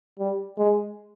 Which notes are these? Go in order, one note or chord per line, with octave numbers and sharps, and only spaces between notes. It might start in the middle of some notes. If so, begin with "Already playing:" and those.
G3
G#3